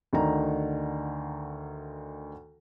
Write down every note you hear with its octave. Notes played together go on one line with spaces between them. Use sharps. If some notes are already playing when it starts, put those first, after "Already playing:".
D2 D3 D#3 A#5